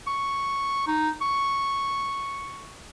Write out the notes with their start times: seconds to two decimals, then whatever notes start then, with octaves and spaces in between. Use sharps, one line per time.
0.07 C#6
0.87 D#4
1.22 C#6